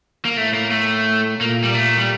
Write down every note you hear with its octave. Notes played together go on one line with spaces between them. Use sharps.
A#3
A2 A3
A#3
A3
A#2 A#3
G3
A3
G3